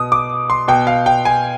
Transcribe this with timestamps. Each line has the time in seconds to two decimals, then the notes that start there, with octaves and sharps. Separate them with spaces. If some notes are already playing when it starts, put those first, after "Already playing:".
Already playing: B2 D#6
0.12 D6
0.50 C6
0.68 B2 G5
0.87 F5
1.06 G5
1.25 G#5